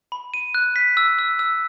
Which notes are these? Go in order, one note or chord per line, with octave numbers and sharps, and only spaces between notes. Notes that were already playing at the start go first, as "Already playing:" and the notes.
B5
D#7
F#6
B6
E6
E6
E6